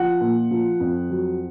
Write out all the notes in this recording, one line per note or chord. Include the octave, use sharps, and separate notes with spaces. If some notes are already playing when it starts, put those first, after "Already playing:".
Already playing: F3 F#5
A#2
F3
F2
F#3